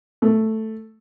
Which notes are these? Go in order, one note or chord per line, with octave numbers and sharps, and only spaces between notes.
A3